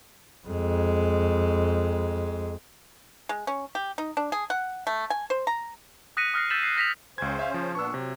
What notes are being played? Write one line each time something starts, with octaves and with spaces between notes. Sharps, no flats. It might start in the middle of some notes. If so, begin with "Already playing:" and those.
F2 G#3
G#3
C#4
G4
D#4
D4
G#4
F#5
A3
G#5
C5
A#5
D#6 F#6 A#6 B6 C#7 D#7
D#6 F6 F#6 A#6 C7
E6 G6 A6 B6 E7 F#7
C7
F#6 A#6 B6 E7 F7
C#2 C#3 C#4 C5 G#6
E5 F5
F3
A#2 B3 D4 C#6 E6
C3 F#3